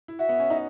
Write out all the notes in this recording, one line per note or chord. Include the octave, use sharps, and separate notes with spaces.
E4
F#4 E5
B3
C#4
D#4